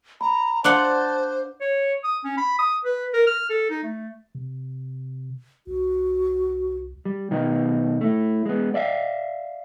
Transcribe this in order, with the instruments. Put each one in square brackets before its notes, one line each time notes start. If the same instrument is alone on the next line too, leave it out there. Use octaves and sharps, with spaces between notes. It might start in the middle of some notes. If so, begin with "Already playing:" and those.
[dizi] A#5 [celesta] B5
[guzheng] D4 F4 F#5 [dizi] C5 [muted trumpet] A5 [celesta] C6 D6 F#6
[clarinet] C#5
D#6
C#4
B5
D#6
B4
A#4
F6
A4
D#4
A3
[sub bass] C3
[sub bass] C2 [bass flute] F#4
[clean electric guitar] G3
B2 D#3 B3 D#4
A3 E4
G#3 B3
D5 E5 F5